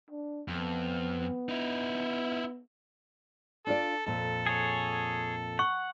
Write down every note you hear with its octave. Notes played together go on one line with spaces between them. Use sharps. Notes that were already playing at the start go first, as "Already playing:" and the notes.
D4
F2 B3
D#4 E4
D4 F4 A4 D5
F2 A#2 A4
G#4 C#5
F#5 C#6